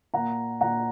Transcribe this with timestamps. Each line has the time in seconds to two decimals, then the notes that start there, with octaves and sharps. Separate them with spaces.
0.13 A#2 A#3 F#5 A#5
0.61 A#2 A#3 F#5 A#5